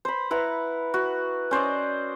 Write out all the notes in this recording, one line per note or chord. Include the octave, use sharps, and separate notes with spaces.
C5 B5
E4 B4 F#5 A#5
F#4
C#4 C5 D5 D#5